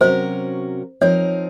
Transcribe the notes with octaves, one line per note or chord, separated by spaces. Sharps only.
C3 F#3 C#4 F#4 A#4 C5
F3 C4 D#4 A#4 C#5